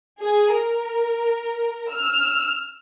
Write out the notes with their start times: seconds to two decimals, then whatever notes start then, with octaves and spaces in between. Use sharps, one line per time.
0.21 G#4
0.56 A#4
1.92 E6 F6